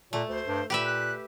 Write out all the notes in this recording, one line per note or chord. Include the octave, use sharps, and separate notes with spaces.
A#2 A3
D2 C5
G2
A#2 G4 B4 E5
F#6